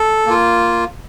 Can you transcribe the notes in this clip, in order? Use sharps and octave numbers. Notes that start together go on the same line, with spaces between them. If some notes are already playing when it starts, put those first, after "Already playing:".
Already playing: A4
A#3 F4